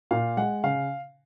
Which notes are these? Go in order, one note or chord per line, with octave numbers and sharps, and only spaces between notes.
A#2 F5
G#3 F#5
C#3 F5